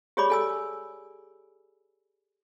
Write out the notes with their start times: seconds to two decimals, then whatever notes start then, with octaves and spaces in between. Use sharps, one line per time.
0.17 G4 G#4 C#5 D5 B5 D6
0.30 A4 G#5 E6